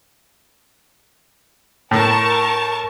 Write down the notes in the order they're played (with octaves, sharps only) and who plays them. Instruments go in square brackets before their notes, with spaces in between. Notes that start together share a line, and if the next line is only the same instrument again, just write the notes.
[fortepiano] A2 [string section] A#4 A5 C#6